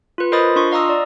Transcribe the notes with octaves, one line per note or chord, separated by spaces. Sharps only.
F4 B4
A#4 C5 D#5 B5 D#6 A6
D4 F4 C6 C#6
D#5 F5 A#5 D#6 E6
D5